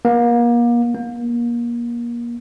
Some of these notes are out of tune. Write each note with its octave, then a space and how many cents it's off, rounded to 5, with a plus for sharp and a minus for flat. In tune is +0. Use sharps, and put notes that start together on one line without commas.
A#3 +35
A#3 +30